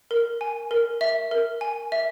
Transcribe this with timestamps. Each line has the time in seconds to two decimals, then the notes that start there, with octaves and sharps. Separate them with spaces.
0.11 A#4
0.41 G#5
0.71 A#4
1.01 E5
1.31 A#4
1.61 G#5
1.92 E5